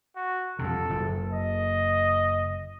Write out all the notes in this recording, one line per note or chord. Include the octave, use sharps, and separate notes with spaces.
F#4
F2 G#2 C3 A4
F#1 F#2
D#5